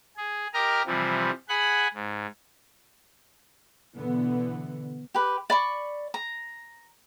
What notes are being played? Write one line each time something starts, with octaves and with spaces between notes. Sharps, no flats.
G#4
G4 A#4 D#5 A#5 F6
C3 E3 F3 G3
G#4 F#5 G#5 B5 F#6
G#2
B2 D3 E3 B3
G4 B4
D5 B5 C#6
A#5